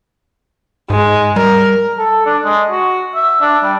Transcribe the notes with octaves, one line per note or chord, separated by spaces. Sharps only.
G#2 G#3
G3 A#4
A4
D4
G#3
F#4
E5
D4
G3